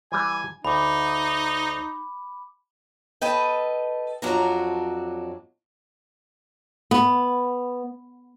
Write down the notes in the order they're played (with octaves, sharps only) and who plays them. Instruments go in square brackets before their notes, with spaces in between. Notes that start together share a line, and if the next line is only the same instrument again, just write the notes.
[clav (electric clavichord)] E3 G3 [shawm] G#5
[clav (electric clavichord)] D2 [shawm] D#4 [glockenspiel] B5 D6
[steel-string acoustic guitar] A4 B4 D#5 G5
F2 F#3 D4 F#4 A#5
[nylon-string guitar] B3